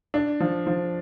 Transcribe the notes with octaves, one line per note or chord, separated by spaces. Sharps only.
D4
F3
F3